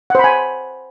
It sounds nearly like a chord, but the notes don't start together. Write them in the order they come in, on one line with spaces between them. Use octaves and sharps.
F#5 C5 B5 G#5